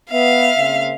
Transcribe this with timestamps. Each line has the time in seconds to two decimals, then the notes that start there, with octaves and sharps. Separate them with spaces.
0.11 B3 E5 F5
0.57 C#3 A#3 C4